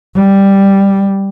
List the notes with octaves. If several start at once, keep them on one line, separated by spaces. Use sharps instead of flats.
G3